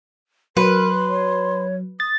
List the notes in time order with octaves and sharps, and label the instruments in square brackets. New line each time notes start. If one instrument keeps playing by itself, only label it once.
[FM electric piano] F#3 [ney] A#4 [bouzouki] B4 [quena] C6
[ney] C#5
[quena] D#6 [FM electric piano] A6